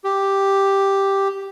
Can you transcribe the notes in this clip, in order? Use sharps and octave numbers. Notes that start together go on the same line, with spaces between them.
G4